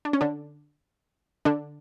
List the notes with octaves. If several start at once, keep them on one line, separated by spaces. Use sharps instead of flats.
D4
C#4
D3 D4
D3 D4